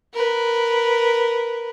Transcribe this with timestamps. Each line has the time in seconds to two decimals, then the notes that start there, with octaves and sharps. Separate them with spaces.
0.14 A#4 B4